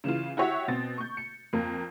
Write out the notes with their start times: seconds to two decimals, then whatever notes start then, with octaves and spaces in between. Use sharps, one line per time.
0.04 C#3 E3 F4
0.37 E4 F#4 G4 C#5 E5 F#5
0.68 B2 C4 A6
0.98 C#6 G6
1.17 C#7
1.53 F2 A#3